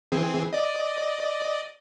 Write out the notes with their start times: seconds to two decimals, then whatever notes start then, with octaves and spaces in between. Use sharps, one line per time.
0.12 E3 C4 G#4
0.53 D5 D#5